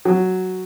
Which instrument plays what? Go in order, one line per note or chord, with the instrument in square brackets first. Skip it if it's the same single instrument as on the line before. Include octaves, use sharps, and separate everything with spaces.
[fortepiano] F#3